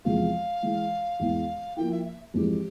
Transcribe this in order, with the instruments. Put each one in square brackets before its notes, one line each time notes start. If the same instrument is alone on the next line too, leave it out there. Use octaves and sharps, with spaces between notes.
[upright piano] E2 C3 F3 G#3 [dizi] F5
[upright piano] E3 G#3 E4
E2 E3 G#3
[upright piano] F3 A#3 E4 [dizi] G5
[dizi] E5
E5
[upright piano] F2 E3 G#3 [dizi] G4